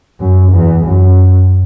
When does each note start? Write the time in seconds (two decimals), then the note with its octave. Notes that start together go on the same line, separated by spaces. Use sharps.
0.20 F#2
0.53 E2
0.86 F#2